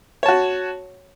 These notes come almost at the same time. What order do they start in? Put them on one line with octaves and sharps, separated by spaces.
C#5 A5 F#4